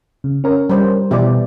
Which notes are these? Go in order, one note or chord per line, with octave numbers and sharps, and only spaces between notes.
C#3
C#4 A#4 C#5
G3 C5
B2 E3 G4 D5